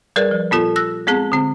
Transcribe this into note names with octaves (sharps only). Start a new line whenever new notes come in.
G3 G#4 A#4 B4 D5
F3
A#2 B3 F4 A4
E6 F#6 A#6
G#3 B3 C4 G#4
D3 C4